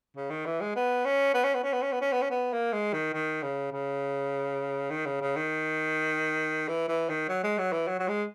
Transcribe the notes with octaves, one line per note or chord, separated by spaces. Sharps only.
C#3
D#3
E3
G#3
B3
C#4
B3
C#4
B3
C#4
B3
C#4
B3
C#4
B3
C#4
B3
A#3
G#3
D#3
D#3
C#3
C#3
D#3
C#3
C#3
D#3
E3
E3
D#3
F#3
G#3
F#3
E3
F#3
F#3
G#3